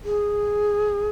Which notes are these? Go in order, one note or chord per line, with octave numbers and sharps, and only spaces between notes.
G#4